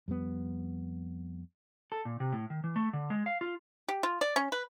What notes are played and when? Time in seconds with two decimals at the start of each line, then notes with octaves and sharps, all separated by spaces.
0.08 F2 G3 B3
1.92 A4
2.05 A#2
2.20 C3
2.32 A2
2.50 D#3
2.64 E3
2.76 A3
2.93 D3
3.10 G#3
3.26 F5
3.41 F4
3.88 G4
4.03 F4
4.21 D5
4.36 C#4
4.52 B4